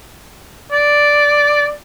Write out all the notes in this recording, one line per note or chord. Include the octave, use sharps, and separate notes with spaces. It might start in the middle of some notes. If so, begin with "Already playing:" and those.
D5